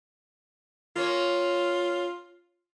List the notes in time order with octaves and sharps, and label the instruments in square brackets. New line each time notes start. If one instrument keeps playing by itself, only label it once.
[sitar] A#3 C#4 C#5 [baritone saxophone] F4